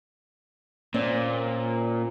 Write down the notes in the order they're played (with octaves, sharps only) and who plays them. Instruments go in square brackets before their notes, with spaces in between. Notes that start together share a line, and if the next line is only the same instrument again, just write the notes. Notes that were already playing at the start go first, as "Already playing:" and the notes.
[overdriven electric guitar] A#2 [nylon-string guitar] C4 C#4 D5